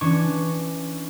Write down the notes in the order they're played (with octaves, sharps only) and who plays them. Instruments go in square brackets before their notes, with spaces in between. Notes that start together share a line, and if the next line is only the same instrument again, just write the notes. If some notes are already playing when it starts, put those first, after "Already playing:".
[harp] E3 C#4 D4 C#6